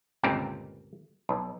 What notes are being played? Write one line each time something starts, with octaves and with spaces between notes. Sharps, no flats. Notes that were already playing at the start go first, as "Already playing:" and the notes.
G1 C#2 A#2 C4 A#4
B1